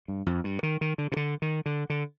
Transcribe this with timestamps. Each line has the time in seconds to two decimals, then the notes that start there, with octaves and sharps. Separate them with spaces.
0.08 G2
0.26 F2
0.44 G2
0.63 D#3
0.81 D#3
0.98 D3
1.12 C3
1.17 D3
1.42 D#3
1.66 D3
1.90 D3